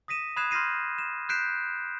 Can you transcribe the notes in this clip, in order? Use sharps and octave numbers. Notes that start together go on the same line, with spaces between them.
D#6 A#6 B6 D#7 E7
B5 D#6 F#6 G#6 C7 E7
C6 F6 G6 A#6 C7 D#7
E7
F#6 G6 B6 C7 D7 E7